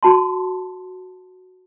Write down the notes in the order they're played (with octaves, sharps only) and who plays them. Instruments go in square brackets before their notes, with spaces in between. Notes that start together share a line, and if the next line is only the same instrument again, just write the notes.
[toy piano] F#4 A5 C6